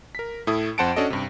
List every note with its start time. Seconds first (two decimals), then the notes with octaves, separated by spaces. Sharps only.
0.15 A#4 B6
0.47 A2 E4 A4 D#6
0.78 F2 C5 F#5 A5 C#7 D7
0.96 C#4 D4 F#4 A4 D#5
1.10 G2 C3